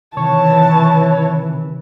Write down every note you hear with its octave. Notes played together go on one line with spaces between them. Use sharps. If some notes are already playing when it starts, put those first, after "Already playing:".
C3 D#3 E3 C#5 A5